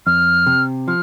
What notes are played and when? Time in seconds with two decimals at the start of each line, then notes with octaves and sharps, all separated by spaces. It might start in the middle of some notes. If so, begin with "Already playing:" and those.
0.06 F2 F6
0.47 C3
0.88 F3 F6